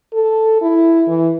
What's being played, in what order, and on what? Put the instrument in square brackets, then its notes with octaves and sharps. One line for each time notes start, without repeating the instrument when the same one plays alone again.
[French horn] A4
E4
E3